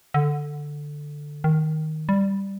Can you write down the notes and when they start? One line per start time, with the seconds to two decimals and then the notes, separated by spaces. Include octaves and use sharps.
0.14 D3
1.44 D#3
2.09 G3